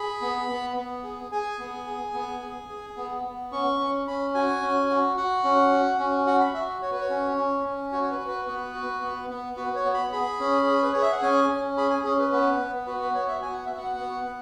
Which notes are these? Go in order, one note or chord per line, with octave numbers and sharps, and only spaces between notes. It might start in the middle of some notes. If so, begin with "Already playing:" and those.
Already playing: G#4 B5
B3
B3
B3
G#4
G#4 G#5
B3
G#4
B3
G#4
G#4
B3
B3
C#4 C#6
C#4
C#4 B5
F#4 G#5
C#4
F#4
F#4 F#5
C#4
F#4
C#4
F#4 F#5
B5
F#4 E5
F#4 C#5
B4
C#5
C#4
C#4
C#4
F#4 C#5
C#5
B4
F#4
B4
B3 B4
F#4
B3
B3
F#4 B4
C#5
B3
B5
G#4 B5
C#4
G#4
B4
G#4 C#5
E5
F#5
C#4 G#5
C#4
G#4 B5
G#5
C#4 G#4
B4
B3 B4
B3
F#4 B4
B4
B3 C#5
E5
F#4 G#5
F#5
B3 E5
F#5
B3
B3